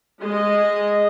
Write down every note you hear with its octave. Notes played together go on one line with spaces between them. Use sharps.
G#3 D#5